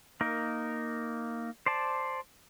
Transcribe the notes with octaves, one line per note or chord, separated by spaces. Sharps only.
A#3 D#4 A#4
C5 D5 A5